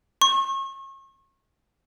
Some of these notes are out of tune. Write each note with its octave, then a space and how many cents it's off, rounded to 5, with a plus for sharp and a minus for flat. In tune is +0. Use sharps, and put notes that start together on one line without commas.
C#6 -35